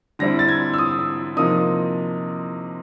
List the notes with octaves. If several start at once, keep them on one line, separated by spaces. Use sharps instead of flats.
D3 G3 C4 E4 A#6
A6
G#6
E6
D#6
C3 F3 A#3 D#4 D#6